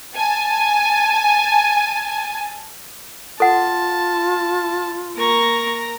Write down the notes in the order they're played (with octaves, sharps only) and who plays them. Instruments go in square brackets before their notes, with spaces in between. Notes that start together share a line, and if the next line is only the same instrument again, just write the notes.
[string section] G#5 A5
[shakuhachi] F4 [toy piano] A4 F#5 [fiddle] A5
[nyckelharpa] A#3 C#6 [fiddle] A#4 A#5